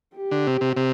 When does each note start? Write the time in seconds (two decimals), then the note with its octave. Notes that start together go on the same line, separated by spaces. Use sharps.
0.17 G4
0.31 D3
0.47 C3
0.61 C3
0.77 C3